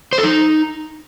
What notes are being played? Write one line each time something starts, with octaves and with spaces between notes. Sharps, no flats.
C5
A4
D#4